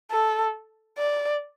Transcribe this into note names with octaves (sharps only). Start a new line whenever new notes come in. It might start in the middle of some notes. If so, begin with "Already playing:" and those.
A4
D5